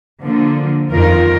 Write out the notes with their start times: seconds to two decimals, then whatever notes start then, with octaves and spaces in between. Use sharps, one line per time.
0.21 D3 F3 A#3
0.92 F2 D#3 F4 A#4